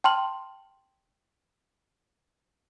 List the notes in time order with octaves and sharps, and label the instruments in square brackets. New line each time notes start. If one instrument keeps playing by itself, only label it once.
[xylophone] G5 A5 C6 F6 F#7